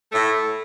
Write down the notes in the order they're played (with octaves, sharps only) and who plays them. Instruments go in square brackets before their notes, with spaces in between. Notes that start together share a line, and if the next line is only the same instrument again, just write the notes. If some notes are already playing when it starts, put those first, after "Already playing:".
[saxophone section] A2 A3